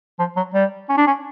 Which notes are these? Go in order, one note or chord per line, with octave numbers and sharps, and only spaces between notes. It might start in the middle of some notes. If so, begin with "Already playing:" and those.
F3
F#3
G3
C#4
D4
C#4